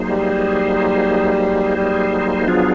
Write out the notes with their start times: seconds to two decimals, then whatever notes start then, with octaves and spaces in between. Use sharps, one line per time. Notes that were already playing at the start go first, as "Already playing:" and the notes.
Already playing: F#3 A#3 D#4 G#4 C5
0.09 G3
1.76 G3
2.48 F3 F#3 B3 D4 F4 G#4